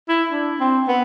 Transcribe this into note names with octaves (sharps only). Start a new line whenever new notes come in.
E4
D4
C4
B3